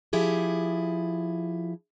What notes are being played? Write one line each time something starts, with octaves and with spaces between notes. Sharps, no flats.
F3 E4 G4 G#4